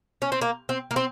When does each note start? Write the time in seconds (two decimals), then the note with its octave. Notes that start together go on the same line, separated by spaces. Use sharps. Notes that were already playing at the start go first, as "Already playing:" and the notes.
0.22 C#4
0.32 C4
0.42 A#3
0.69 C4
0.91 A#3
0.96 C4